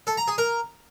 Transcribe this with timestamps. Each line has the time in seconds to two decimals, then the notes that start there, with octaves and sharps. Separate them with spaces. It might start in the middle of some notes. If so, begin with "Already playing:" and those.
0.07 A4
0.17 A#5
0.28 G#4
0.38 A#4